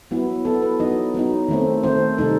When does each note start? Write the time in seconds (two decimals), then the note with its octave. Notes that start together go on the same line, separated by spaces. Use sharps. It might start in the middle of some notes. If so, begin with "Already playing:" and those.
0.11 F#3 B3 E4
0.45 F#3 B3 E4 A4
0.62 B4
0.80 F#3 B3 D#4 D#5
1.14 F#3 B3 D#4
1.48 D#3 A3 C4
1.83 D#3 A3 C4 C5
2.18 C3 D#3 G3 D#4 A4